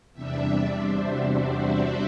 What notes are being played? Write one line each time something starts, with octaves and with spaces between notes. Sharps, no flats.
E2 C3 G3 D4 E5
D5
C5
F#4